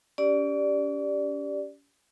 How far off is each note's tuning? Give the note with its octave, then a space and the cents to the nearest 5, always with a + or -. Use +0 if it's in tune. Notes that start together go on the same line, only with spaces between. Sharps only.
C#4 +40 G4 +0 D5 +0